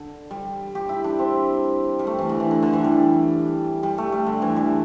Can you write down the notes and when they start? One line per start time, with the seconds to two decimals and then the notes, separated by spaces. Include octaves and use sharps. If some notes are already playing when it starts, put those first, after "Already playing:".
Already playing: D3
0.31 G3
0.75 G4
0.89 E4
1.04 D4
1.19 C4
1.99 G3
2.07 A3
2.19 E3
2.29 D3
2.40 E3
2.51 D3
2.62 D3
2.73 E3
2.84 G3
3.83 G3
3.98 A3
4.12 G3
4.26 D3
4.42 E3
4.57 G3